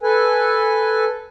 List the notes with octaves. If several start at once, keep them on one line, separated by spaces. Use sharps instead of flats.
A4 B4 G#5